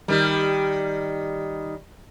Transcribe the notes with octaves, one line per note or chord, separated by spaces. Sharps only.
D#3 G3